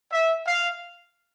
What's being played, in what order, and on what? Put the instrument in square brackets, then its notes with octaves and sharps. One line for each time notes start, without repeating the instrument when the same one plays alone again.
[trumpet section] E5
F5